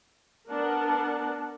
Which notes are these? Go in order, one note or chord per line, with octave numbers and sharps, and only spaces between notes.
B3 D4 A#4 F#5 A5